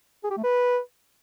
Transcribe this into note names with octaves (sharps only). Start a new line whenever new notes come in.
G#4
G4
A3
B4